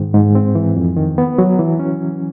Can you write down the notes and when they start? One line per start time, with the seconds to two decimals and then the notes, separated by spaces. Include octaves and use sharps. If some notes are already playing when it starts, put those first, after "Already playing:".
Already playing: G#2 D#3
0.14 G#2
0.35 C4
0.55 E3
0.76 F2
0.96 D#3
1.18 B3
1.38 F#3
1.59 E3
1.79 C#4